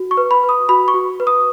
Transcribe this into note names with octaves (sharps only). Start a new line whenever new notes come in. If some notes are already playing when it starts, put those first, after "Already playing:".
Already playing: F#4
C#6
B4
B5
B4
D#6
F#4 B5
C#6
F#4
B4
D#6